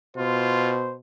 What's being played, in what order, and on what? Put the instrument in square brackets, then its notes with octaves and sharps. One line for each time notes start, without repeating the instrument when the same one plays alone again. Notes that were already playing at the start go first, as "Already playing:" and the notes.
[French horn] B2 [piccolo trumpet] F4 [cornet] C5